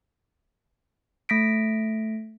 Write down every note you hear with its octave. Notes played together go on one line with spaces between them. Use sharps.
A3 A#6 B6 D7